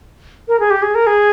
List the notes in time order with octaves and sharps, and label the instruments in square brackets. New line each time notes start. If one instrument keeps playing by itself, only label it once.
[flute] A#4
G#4
G4
G#4
A#4
G#4